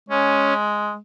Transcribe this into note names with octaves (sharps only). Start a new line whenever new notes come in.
G#3 C#4